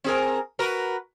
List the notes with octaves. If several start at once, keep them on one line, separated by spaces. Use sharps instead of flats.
C4 G#4 A#4
F#4 A#4 B4